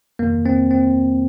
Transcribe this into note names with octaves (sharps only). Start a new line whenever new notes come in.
F2 C3 D#3 A#3
C4
C4